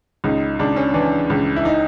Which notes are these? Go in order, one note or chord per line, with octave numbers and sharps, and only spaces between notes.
C#2 D#4
C#2 D4
C#4
E3 D4
C#2
E4
D#4